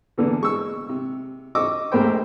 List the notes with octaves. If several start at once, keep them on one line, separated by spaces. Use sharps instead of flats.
E2 A#2 D3 E3
G#3 C#6 E6
C3
D#5 C#6 D6 E6
A#1 D#2 A2 A#4 C5 G5